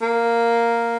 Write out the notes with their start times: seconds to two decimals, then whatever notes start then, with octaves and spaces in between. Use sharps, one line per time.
0.02 A#3